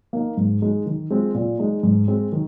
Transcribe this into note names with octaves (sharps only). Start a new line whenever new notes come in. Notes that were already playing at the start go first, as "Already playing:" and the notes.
A#3 D#4
G#2
G#3 D#4
D#3
G#3 C4 F4
A#2
G#3 D#4
G#2
G#3 C4
D#3